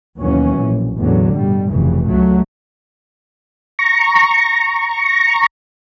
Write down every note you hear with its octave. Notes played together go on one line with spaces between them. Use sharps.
D#2 B2 E3 F#3 C#4
A#1
A1 E2 A2 D3 F#3
G2 B2 G3
F1 C#3 E3
C#2 F#3 A3
A#5 C#6